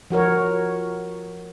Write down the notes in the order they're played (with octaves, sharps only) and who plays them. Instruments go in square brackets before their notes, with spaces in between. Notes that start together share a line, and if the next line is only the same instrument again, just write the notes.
[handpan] F3 F#4 A#4 C#5